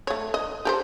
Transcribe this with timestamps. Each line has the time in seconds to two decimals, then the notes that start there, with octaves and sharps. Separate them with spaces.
0.07 A3 C#5
0.34 D#5
0.65 G4 A4 C5